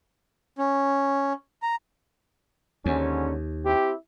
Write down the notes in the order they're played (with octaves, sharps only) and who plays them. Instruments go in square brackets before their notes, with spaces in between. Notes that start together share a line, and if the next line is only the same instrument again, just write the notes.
[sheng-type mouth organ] C#4
A#5
[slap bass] D#2 [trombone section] G#2 D3 C#4
[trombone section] C4 E4 G4